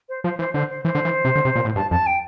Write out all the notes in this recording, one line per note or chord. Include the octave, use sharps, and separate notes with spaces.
C5
F3 C5
E3 C5
D3 C5
C5
E3 C5
D3
E3
C3
D3
C3
A#2
A2
G2 A5
F2 A5
G5